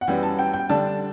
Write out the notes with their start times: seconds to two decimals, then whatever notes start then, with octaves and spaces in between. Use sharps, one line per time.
0.01 F#5
0.07 F#2 E3 G3 C#4 G5
0.23 A5
0.39 G5
0.53 G5
0.69 D3 G3 D4 A5